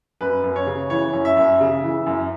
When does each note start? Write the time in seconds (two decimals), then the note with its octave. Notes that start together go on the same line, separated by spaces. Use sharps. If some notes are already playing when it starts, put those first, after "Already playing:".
0.21 F#2 B4
0.44 F#2
0.56 C#5
0.67 C#3
0.90 E3 C#5
1.13 F#2
1.25 E5
1.37 F#2
1.61 C#3
1.84 E3
2.07 F#2